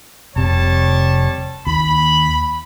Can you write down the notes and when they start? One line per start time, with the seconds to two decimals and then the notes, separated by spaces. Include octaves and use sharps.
0.36 F1 C3 G3 C#5 A5
1.67 D#2 B5